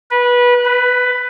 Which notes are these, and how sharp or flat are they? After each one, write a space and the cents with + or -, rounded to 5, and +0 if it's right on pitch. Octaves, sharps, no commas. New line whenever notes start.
B4 -20
B4 +10